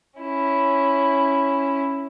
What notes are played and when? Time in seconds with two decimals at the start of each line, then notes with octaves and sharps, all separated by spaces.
0.20 C#4 E4